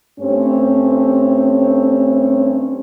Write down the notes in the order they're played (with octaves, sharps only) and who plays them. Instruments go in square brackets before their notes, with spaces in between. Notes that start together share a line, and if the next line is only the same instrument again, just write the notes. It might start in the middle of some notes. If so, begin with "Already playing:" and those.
[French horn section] G2 G3 A3 C4 C#4 C#5